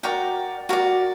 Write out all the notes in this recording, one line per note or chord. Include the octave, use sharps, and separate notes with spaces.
F#4 A#4 D5 G5
F#4 A#4 D5